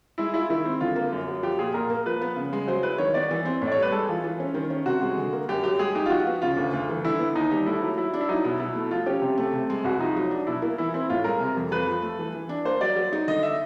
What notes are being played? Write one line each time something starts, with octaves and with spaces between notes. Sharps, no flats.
G#3 E4
E4 F4
D#3 E4
C4
D3 F4
A#3
F#2
F#3
F3 G4
A#2 G#4
A#2 A#4
A#3
F3 B4
B3
C#3
G#3
F#3 C5
E4 B4
D#3 C#5
B3 D5
E3
C4
A2 C#5
D5
C#5
G3
B4
G#3 A4
E3 F4
E3
C#4
D#3
C#4
C3 F#4
G#3
D3
A#3
F#2 G4
F#3 G4
G#3 G#4
D#4 G4
F4
F3 F#4
B3
C#3 F4
D2
D2
E3
D3 E4
B3
D#2 D#4
G3
A3 E4
F#3
F#3 E4
D4
E4
F#3 D#4
B2 E4
B2 E4
A3
F3 F4
C#4 G4
C3
A3
C3
G#3
C2 F#4
F3 D#4
F#3
D4
B2 E4
A#3 E4
E3 E4
C4 E4
A2 F4
G#3 A#4
C3
F2
F2 B4
F3
A3
E3
E3
D4
A#3 C5
F#3 D5
F#3
D#4
D3 D#5
E5